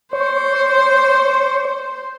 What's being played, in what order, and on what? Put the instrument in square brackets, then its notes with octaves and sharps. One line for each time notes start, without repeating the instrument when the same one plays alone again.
[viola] C5 [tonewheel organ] C#5